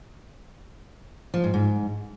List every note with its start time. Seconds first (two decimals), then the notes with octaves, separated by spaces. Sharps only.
1.34 F3
1.44 G#2
1.54 G#2